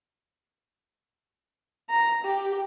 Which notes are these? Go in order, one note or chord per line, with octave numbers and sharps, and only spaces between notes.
A#5
G4